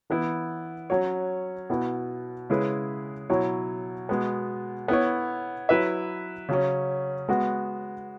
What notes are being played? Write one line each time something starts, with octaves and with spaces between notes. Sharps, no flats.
E3 B3 E4
F#3 C#4 F#4 C#5
B2 B3 E4
C#3 G#3 E4 G#4 B4
B2 F#3 E4 C#5
B2 G#3 B3
B3 E4 C#5
F#3 E4 B4 E5
C#3 F#3 C#4
G#3 B3 F#4